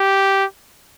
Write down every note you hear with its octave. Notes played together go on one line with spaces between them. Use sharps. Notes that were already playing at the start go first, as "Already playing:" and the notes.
Already playing: G4